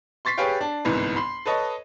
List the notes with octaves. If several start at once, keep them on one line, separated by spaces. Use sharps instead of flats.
C6 C#6 A6 B6 C7
G4 G#4 B4 C#5 F5 G5
D4
G1 C2 G#2 E3 B4
B5 C6 C7
A4 B4 C#5 D#5 A5